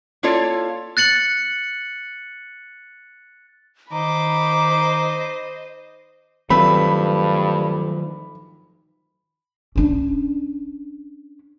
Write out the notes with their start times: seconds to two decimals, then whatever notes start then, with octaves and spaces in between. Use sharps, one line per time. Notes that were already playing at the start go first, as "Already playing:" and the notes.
0.23 A#3 E4 F4 A4 C#5 D5
0.97 F#6 A6 C#7 F#7
3.92 D#3 C5 D#5 A#5 B5 D6
6.50 G2 D#3 F3 F#3 A3 C4 B4 B5
9.76 C#4 D4